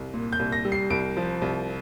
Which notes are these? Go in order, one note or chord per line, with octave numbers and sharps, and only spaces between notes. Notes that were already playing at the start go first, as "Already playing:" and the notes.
Already playing: C2
A#2
G6
C2
A#6
G3
C7
C2 D7
F3
C2